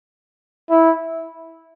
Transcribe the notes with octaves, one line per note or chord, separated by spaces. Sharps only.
E4